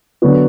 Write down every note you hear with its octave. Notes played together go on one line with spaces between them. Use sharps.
D3 F#3 B3 F#4